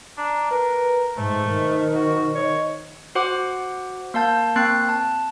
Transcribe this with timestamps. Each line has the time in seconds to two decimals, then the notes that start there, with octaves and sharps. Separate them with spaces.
0.18 D4 A#5
0.51 A#4 B4
1.17 G#2 A3 C5
1.49 D#3
1.95 F#4
2.35 C#5 D#5
3.15 F#4 C5 F#5 D6
4.14 A#3 F5 A5 G6
4.56 A#3 C4 G5 F#6 A6 C7
4.89 A5